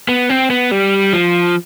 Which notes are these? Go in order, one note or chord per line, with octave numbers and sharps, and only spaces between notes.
B3
C4
B3
G3
F3